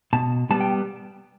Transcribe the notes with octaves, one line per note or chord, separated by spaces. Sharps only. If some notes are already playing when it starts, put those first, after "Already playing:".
B2 A5
G3 B3 A5
G5